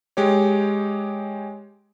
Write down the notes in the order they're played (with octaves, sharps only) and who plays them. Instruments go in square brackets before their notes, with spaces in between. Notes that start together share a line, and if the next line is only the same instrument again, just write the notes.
[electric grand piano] G#3 G4 C#5